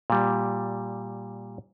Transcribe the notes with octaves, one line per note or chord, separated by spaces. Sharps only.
A#2 G3